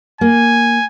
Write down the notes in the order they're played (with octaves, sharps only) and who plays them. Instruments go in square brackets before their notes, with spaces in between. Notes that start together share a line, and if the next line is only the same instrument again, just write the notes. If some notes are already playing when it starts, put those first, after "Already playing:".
[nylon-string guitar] A#3 [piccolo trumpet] G#5